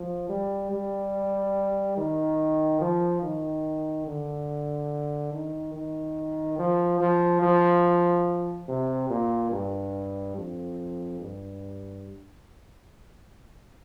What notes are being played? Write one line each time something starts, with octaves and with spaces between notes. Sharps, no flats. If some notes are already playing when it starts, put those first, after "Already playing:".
Already playing: F3
G3
G3
D#3
F3
D#3
D3
D#3
D#3
F3
F3
F3
C3
A#2
G2
F2
G2